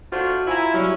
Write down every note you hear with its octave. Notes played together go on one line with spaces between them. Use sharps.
A3 D4 F4 F#4 C5
E4 F4 G#5 A#5
F#3 G3 C#4 E4